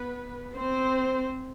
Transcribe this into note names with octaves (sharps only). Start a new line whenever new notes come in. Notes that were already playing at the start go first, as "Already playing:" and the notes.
Already playing: B3 B4
C4 C5